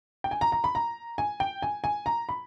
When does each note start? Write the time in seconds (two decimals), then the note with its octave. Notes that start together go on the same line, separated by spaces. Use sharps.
0.24 G5
0.31 G#5
0.41 A#5
0.52 A#5
0.64 B5
0.75 A#5
1.18 G#5
1.40 G5
1.62 G#5
1.84 G#5
2.06 A#5
2.29 B5